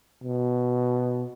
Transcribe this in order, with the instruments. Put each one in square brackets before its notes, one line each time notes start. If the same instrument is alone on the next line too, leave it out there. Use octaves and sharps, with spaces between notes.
[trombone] B2